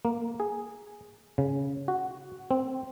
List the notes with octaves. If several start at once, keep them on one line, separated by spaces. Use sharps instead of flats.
A#3
G#4
C#3
F#4
C4